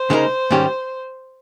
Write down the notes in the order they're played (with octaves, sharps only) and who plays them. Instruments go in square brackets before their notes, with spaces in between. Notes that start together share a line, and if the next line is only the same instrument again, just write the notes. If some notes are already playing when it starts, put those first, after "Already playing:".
Already playing: [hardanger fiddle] C5
[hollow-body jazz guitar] C#3 G#3 D#4 A#4
G#2 D#3 G3 C#4 G4